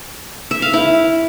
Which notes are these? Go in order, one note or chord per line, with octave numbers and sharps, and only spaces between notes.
E5
F5
E4